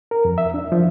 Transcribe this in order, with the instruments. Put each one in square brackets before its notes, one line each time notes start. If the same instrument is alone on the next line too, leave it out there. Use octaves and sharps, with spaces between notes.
[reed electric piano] A#4
F2
E5
D4
F3